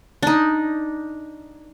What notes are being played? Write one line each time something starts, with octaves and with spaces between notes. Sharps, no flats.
D4 D#4